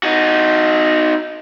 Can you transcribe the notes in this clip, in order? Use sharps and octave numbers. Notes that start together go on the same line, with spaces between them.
D#4 F#4